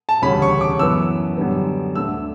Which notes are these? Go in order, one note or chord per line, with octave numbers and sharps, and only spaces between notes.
A5
E1 D2 C#3 G3 C#4 B5
C#6
D6
F#2 E3 B3 E6
F#2 D3 G3 B3
D2 D3 A3 E6